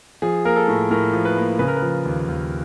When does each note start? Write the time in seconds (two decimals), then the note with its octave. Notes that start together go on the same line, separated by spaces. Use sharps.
0.22 F3 G#4
0.45 A#3 A#4
0.56 A4
0.68 A2
0.91 A2 A#4
1.13 F3
1.25 B4
1.36 A#3
1.59 C#3 B4
1.68 A#4
1.76 B4
1.82 F3
2.05 D#2
2.28 D#2